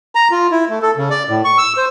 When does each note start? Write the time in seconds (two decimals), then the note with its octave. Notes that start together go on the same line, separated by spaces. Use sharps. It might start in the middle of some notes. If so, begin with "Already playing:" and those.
0.15 A#5
0.31 F4
0.51 E4
0.69 A3
0.82 A4
0.97 C#3
1.10 D5
1.29 A2
1.45 C#6
1.58 E6
1.77 C5